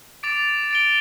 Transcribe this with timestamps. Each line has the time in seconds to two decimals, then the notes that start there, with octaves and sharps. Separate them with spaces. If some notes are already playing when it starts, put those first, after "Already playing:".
0.23 D6 A6 D7 F7
0.71 A6 D7 G7